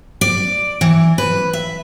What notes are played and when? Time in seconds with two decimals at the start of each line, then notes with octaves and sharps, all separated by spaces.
0.21 D5
0.81 E3
1.18 B4
1.53 E5